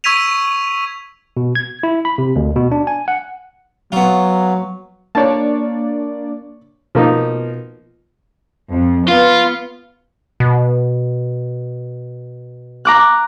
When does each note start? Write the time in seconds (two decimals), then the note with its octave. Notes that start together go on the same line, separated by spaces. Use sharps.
0.04 C#6 E6 G#6 B6 D#7 F7
1.37 B2
1.55 G#6
1.83 E4
2.05 B5
2.18 C3
2.36 D2
2.56 B2
2.72 D4
2.87 G#5
3.08 F#5
3.92 F#3 B3 F4
5.15 A#3 D4 C#5 D5 A5
6.95 B2 F3 A#3 D#4
8.71 F2
9.08 B3 F4
10.40 B2
12.85 A#5 D6 F#6